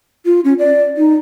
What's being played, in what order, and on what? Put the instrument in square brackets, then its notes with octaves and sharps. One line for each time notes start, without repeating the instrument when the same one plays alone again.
[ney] F4
C#4
D5
D#4